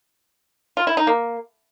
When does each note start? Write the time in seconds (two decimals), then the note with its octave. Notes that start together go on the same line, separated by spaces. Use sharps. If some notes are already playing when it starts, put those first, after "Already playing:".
0.77 F4
0.87 E4
0.97 D#4
1.07 A#3